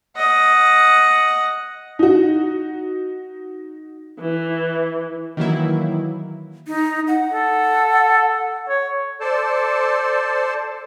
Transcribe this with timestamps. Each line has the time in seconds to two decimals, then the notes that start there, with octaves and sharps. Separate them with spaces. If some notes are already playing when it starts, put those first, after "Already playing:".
0.17 D#5 F#5
1.99 D#4 F#4
4.20 E3
5.37 D#3 E3 F#3 A#3 E4
6.67 D#4
7.08 F#5
7.33 A4
8.69 C#5
9.20 A4 C5 D5 A5